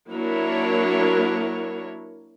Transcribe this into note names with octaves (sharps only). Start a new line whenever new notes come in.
F#3 A#3 D4 E4 A#4 C#5